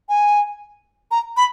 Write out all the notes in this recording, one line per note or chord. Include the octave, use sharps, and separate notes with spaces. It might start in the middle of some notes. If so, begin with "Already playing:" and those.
G#5
A#5
B5